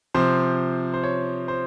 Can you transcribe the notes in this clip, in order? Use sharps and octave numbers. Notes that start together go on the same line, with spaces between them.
C3 F3 C5
C5
C#5
C5